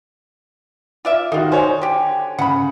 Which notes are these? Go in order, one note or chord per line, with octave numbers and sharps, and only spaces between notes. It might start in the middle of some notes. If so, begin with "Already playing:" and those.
F4 D5 E5
D#3 D#4 F4 F#4
C5 C#5 G#5
D3 G4
C#3 F#5 B5